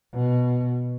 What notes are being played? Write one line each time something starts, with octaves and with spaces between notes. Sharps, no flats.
B2